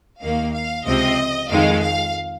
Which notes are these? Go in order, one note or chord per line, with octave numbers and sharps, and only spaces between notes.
D#2 D#3 A#3 F5
F5
C#2 C3 F3 C4 D#5
F2 D#3 G#3 F5
F5